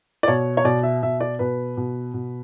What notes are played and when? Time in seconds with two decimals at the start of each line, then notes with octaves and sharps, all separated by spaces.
0.23 D5
0.28 B2 C#5
0.57 C#5
0.64 B2 D5
0.83 E5
1.03 B2 E5
1.20 D5
1.39 B2 B4
1.77 B2
2.14 B2